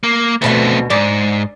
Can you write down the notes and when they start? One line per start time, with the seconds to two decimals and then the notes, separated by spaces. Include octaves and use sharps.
0.03 A#3
0.42 D2 B2 A3 C4 E5
0.90 G#2 D5